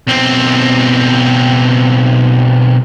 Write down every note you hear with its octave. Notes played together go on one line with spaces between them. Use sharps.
B1 C4